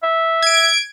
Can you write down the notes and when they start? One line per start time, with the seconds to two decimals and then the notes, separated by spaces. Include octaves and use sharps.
0.03 E5
0.42 G#6 D7